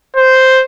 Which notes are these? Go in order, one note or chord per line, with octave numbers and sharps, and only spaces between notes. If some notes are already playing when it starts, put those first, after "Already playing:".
C5